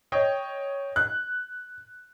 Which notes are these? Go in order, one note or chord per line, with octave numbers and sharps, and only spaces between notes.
C#5 D#5 G5
F#6